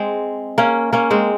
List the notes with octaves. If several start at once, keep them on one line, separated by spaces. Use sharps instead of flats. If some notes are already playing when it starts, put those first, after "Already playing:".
Already playing: G#3 C4
A#3 C#4
A#3 C#4
G#3 C4